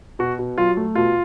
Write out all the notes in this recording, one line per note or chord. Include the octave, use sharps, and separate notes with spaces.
B2 F#4
B2
F#3 F4
A3
B2 F4